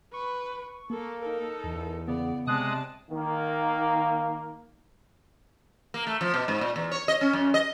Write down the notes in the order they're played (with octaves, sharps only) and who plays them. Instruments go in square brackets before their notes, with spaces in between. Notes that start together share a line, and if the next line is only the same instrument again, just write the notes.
[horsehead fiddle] B4 [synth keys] C#6
[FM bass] A#3 [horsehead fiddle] A4
[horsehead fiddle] D#4 A4 [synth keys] A#4
[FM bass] E2
[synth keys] C#3 B3 [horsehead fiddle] D5
[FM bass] C3 [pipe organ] G#3 D#6 F#6 [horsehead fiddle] D5 A5
[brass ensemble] D#3 A#3
[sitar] A#3
A3
F3
B2
G#2
A#2
E2
C#5
D#5
C#4
F#2
D#5